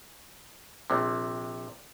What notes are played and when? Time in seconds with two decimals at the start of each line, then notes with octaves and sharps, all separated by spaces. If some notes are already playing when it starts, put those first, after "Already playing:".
0.90 A#1 C3